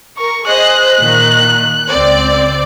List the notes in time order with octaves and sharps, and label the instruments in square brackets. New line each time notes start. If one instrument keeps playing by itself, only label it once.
[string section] A#4 [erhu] C#6
[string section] G#4 C5 D#5 [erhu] F#6
[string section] A#2 D#3
C#2 C4 D5